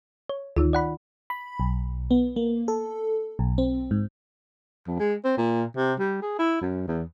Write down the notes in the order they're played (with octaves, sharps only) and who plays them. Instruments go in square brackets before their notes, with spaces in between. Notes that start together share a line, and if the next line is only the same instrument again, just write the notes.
[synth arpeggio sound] C#5
[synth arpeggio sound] D2 [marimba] D#3 D#4 F4
[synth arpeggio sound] D5 F#5 B5
[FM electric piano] B5
B1
B3
A#3
A4
B1
C4
G#2
[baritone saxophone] F2
G#3
C4
A#2
C3
G3
G#4
E4
F#2
E2